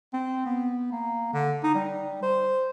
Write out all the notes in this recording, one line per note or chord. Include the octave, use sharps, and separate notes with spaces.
C4
B3
A#3
D3
D#4
G3
C5